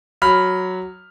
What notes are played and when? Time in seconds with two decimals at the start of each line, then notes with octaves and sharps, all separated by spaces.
0.22 F#3 B5 F6